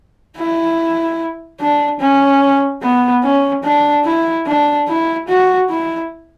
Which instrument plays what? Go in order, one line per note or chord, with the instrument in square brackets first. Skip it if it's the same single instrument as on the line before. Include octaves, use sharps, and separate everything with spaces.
[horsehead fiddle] E4
D4
C#4
B3
C#4
D4
E4
D4
E4
F#4
E4